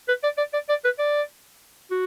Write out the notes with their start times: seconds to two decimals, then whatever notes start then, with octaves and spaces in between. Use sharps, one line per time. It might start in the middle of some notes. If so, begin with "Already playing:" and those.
0.08 B4
0.23 D5
0.38 D5
0.53 D5
0.69 D5
0.84 B4
0.99 D5
1.91 F#4